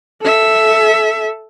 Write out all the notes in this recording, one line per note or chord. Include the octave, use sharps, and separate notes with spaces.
A4 E5